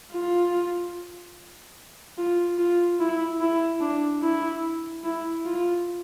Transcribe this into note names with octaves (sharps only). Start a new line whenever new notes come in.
F4
F4
F4
E4
E4
D4
E4
E4
F4